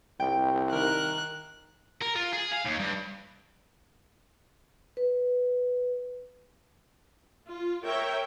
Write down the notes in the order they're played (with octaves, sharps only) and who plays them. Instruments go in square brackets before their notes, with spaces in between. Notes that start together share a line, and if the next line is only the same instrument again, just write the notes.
[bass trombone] C2 [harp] G5
[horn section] D#3 A#4 [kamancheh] F#6
[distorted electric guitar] A#4
F4
G#4
F5
D#2
G2
[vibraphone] B4
[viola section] F4
A#4 C#5 E5 G5